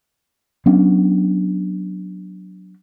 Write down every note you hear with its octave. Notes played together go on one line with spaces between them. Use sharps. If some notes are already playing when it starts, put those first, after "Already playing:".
F#3 B3 C#4 D4